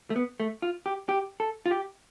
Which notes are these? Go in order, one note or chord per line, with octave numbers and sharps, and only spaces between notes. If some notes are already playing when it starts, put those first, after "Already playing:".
A3
B3
A3
F4
G4
G4
A4
F4
G4